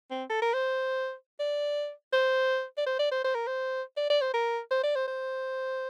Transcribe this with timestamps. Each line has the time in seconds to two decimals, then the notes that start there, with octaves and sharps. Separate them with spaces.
0.11 C4
0.30 A4
0.42 A#4
0.54 C5
1.40 D5
2.13 C5
2.78 D5
2.86 C5
2.99 D5
3.12 C5
3.24 C5
3.35 A#4
3.47 C5
3.97 D5
4.10 D5
4.21 C5
4.34 A#4
4.71 C5
4.84 D5
4.95 C5
5.08 C5